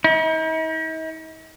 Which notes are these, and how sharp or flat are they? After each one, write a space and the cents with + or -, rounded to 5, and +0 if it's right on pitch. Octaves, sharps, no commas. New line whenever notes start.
D#4 +45